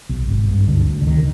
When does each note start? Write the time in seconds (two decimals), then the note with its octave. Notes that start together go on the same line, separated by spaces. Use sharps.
0.09 B1
0.28 G#1
0.48 G2
0.67 D2 D3
0.87 D2
1.01 D3
1.06 C2 D#3